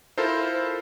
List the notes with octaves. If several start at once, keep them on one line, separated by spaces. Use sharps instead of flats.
E4 F4 A4 A#4 C5